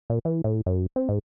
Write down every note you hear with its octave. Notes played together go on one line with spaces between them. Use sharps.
A#2
E3
A2
F#2
C4
G#2